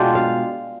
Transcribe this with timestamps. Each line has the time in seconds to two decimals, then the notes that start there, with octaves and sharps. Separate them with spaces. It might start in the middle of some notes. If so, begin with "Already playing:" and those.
Already playing: B2 G#3 D4 F4 G5
0.15 F5